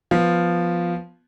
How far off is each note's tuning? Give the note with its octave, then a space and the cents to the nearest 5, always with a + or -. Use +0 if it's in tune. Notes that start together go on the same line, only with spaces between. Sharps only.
F3 +0 B3 +0 F4 +0